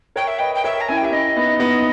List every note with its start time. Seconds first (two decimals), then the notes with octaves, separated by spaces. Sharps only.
0.16 A#4 C#5 G5
0.27 E5
0.38 B4 D#5 G5
0.54 G5
0.64 A#4 C#5 E5
0.80 A#5
0.88 C#4 E4 G#5
0.97 G5
1.02 G4 E5
1.12 C#4 E4 D#5
1.37 B3 D#4
1.60 B3 D#4